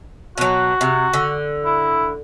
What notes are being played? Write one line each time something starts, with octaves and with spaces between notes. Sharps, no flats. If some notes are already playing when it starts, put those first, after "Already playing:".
B2 F#3 F#4
C3
D3
E4